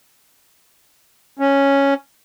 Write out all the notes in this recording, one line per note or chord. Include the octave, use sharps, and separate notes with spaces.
C#4